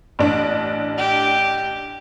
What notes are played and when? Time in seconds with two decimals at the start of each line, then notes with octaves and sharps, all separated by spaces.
0.19 A1 D4
0.98 G4